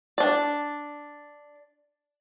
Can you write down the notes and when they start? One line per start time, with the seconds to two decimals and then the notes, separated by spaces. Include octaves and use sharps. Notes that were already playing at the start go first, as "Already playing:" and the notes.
0.18 D4 D5